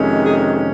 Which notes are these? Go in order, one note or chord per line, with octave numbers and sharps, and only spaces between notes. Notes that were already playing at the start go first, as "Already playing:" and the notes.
Already playing: F2 C3 D#3 G#3 C#4
G#4